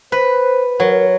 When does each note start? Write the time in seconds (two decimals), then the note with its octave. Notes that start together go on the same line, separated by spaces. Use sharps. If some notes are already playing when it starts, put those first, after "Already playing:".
0.12 B4 C5
0.80 F#3 A#4